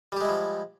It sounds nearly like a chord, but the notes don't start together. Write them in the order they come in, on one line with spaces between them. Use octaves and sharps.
G3 G4 G#3 E4 F3